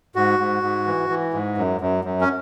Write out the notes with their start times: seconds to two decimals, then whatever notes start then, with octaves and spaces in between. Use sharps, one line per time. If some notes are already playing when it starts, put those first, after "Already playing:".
0.15 G#2 F#4
0.39 G#2
0.63 G#2
0.86 E3
1.10 E3
1.34 G#2
1.58 F#2
1.81 F#2
2.05 F#2
2.21 C#4